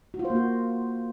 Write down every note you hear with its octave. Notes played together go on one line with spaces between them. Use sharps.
F#4
F4
C5
A#3
F#4